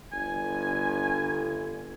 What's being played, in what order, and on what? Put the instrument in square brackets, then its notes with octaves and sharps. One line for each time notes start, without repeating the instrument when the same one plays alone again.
[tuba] G1 [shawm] G#5